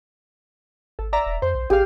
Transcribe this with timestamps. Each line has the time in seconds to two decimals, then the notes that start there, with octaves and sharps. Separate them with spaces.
0.99 G#1 A4
1.13 D5 E5 A#5
1.26 E1
1.42 F2 C5
1.55 B1
1.70 A1 G4 G#4 F5